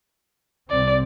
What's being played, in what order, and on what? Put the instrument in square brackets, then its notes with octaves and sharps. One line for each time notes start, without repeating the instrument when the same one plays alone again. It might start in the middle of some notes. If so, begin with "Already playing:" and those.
[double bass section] C2 C4 [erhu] D5